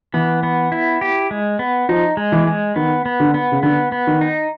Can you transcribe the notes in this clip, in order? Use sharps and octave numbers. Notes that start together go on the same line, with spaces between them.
E3 B3
B3
E4
G4
G#3
B3
F3 D#4
G#3
E3
G#3
D#3 B3
B3
D3
B3
C#3
D3 B3
B3
D#3
D#4